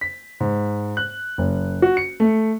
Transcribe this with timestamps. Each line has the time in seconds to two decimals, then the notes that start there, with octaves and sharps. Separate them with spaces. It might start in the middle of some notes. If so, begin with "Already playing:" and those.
0.01 B6
0.40 G#2
0.97 F#6
1.38 F#1
1.82 F#4
1.97 C#7
2.20 A3